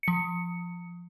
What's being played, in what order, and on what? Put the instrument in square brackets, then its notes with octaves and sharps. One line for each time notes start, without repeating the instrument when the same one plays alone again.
[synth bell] F3 C#7